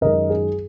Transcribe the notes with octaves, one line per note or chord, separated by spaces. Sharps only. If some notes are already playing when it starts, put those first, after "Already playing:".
F#2 D#3 G#3 A#4 D#5
G#4